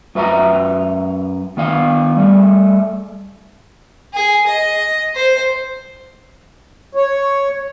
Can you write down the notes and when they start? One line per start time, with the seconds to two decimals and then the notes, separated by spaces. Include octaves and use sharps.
0.15 F#2 B4 E5 G#5 A#5
1.57 D#3 B3 F5
2.17 G3 A3
4.13 G#4
4.46 D#5
5.15 C5
6.95 C#5